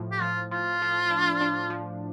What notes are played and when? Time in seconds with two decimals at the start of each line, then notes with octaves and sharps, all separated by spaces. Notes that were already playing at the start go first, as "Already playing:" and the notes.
Already playing: A2 F3
0.11 G4
0.21 F3 F4
0.51 F3 F4
0.82 F3
1.10 D4
1.41 D4
1.70 F3